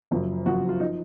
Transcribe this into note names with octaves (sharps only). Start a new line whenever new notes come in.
F#1 F#2 F3
F#1 F#2 F3 F#4
F4
F3 D#4